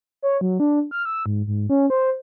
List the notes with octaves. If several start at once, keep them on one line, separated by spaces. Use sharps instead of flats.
C#5
F#3
D4
F6
E6
G#2
G#2
C#4
C5